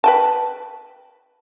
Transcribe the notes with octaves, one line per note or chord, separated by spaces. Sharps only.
B4 G5 A5